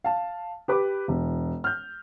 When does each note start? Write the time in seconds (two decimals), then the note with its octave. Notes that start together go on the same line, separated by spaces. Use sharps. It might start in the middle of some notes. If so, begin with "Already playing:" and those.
0.04 F5 A5
0.68 G4 B4 D6
1.08 E1
1.64 F6 G6